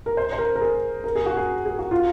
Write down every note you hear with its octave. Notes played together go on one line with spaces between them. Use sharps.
A#4
C5
C5
A#4
A#4
G#4
A#4
G#4
F#4
G#4
G#4
F#4
F4